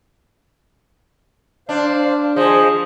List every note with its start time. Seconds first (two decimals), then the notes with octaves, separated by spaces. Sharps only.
1.69 D4 C5 F5
2.36 F3 G#4 C5 D#5